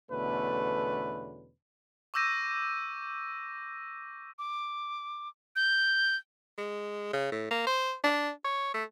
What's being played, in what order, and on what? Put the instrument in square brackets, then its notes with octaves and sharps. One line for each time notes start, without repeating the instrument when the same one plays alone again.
[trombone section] E2 B2 D3 A3 C#4 B4
[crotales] C#6 D6 E6 G6 A#6 D#7
[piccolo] D6
G6
[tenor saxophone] G#3
C#3
A2
A#3
C5
D4
C#5
A3